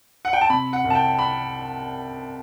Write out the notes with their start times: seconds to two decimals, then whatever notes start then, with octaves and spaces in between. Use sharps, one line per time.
0.25 F#5
0.33 G5
0.41 A5
0.49 C3 B5
0.73 F#5
0.84 C2
0.90 A5
0.95 G5
1.19 B5